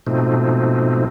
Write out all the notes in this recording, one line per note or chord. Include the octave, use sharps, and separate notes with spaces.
G#2 B2 F3 A3 C4 D#4